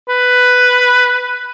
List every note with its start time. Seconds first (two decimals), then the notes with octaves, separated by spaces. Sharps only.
0.09 B4